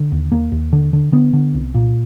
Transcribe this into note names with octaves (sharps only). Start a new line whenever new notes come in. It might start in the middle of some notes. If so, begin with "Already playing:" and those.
Already playing: D3
D#2
D#2 A#3
D#2
D3
D3
D3 B3
D3
C2
A#2